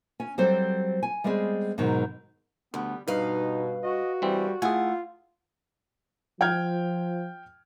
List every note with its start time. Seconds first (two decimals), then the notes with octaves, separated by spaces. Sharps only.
0.20 C#4 G#5
0.38 F#3 G3 C4 A4 C5
1.03 G#5
1.24 G3 G#3 B3 C4 G#4
1.78 G#2 B2 D#3 F#3
2.74 D2 G3 B3
3.08 G2 B2 D#4 B4 F5
3.83 F#4 D#5
4.22 E3 G3 C4
4.62 A3 E4 F4 G#4 F#5 G#5
6.41 F3 G5 F6 G#6